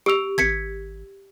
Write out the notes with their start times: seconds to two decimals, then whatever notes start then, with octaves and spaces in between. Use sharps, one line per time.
0.06 G4 E6 D7 F7
0.38 G#1 G#6 B6 C#7